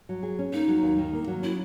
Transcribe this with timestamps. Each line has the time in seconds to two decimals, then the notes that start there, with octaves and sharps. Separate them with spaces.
0.09 F#3
0.23 G#4
0.39 C#4
0.53 A#3 D#4
0.68 F#3
0.83 D#2
0.98 D#3
1.13 A#3
1.27 F#3
1.42 C#4 E4